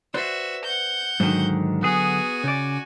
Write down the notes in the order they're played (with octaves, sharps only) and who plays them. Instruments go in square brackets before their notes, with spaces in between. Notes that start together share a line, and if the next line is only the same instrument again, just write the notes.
[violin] F#4 E5 [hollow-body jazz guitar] B4 C5 D5
[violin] F#5 G6
[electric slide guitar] G#2 D#3 [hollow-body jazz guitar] D3 F#3
[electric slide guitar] B3 G#4 [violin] F#4 G#5
[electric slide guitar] C#3 D5